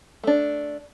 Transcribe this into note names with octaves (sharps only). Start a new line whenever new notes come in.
A3 D4